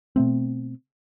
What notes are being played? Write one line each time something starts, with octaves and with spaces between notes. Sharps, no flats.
B2 A3 C4